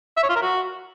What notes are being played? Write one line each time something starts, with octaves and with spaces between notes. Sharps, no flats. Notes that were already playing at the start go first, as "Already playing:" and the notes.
E5
C#5
F4
A#4
F#4